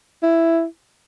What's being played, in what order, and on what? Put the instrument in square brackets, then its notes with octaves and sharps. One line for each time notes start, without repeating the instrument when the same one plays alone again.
[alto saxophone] E4